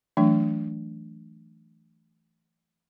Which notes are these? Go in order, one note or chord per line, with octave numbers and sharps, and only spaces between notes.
E3 F#3 A3 D4